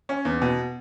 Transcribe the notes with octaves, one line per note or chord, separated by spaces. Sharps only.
C#4
E2
B2